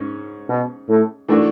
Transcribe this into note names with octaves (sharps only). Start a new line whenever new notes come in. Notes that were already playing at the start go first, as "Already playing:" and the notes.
Already playing: G#2 C#4
B2
A2
E3 A3 D4 F#4